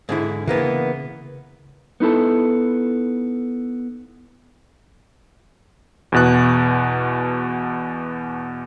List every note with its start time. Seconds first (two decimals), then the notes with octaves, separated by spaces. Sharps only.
0.09 G#2 D3 E4
0.47 C#3 E3 A#3 B3
2.00 B3 D#4 E4 A4 A5
6.12 E2 B2 F#6